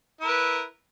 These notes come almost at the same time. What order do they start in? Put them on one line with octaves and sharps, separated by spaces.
E4 A#4 B4